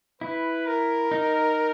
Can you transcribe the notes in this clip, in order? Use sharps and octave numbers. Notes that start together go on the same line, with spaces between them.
E4 B4
A#4
D#4